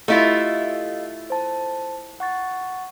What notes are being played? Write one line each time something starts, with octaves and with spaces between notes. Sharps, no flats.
A3 E4 F4 G4 D#5 F5
C5 A5
F#5 C#6 A6